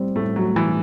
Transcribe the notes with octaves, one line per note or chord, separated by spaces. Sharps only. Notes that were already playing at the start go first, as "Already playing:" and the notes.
Already playing: A2 G3 C4
A2 A3
F#3
A2
E3